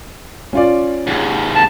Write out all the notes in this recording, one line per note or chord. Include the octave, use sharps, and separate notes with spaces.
C#4 F4 D5
D#2 G#2
A5